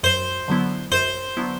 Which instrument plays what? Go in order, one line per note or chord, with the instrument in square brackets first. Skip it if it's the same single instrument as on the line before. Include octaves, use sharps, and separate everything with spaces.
[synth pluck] F#2 [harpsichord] C5
[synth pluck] D3 F#3 B3 E4
[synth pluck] F#2 [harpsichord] C5
[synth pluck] D3 F#3 B3 E4